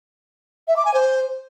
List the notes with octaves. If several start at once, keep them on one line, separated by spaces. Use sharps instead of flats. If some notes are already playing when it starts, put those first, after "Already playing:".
E5
D6
G#5
C5